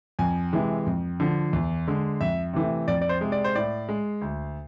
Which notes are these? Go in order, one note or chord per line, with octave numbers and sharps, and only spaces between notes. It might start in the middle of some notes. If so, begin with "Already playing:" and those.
F2 G#5
C3 E3 G#3
F2
D3 F3
E2
D3 G#3
F2 E5
C3 E3 A3
F2 D5
D5
C5
C3 G#3
D5
C5
A2 D5
G#3
D2